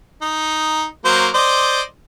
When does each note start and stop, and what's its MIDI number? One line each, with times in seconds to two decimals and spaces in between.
0.22 0.85 63
1.05 1.28 54
1.05 1.28 58
1.05 1.28 72
1.34 1.81 72
1.34 1.81 74
1.34 1.81 75